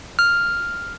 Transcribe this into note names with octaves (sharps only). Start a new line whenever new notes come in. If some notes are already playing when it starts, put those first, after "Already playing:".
F6